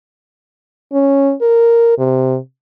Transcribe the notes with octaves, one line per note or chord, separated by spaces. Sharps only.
C#4
A#4
C3